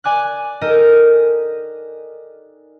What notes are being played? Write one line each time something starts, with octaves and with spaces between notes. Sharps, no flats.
D5 G#5 D6 F#6
D#4 G4 A4 A#4 D#5 A#5